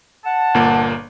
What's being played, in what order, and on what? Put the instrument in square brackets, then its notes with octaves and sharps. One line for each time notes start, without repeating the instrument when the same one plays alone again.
[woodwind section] F#5 A5
[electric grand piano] G1 A#2 A#3